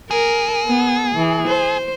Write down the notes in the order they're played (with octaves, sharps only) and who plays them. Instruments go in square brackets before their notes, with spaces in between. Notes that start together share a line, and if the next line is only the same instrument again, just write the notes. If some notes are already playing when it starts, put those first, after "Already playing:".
[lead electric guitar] G#4 [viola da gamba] A#4
[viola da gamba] B3
E3
C5